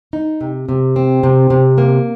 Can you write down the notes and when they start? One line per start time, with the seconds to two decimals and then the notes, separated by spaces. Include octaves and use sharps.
0.13 D#4
0.41 C3
0.69 C3
0.96 C4
1.23 C3
1.50 C3
1.78 A#3